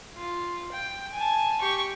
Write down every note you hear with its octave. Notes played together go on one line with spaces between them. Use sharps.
F4
G5
G#5 A5
G4 C#6